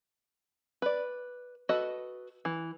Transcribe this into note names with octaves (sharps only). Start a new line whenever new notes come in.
B4 D5
F#4 A4 B4 D#5
E3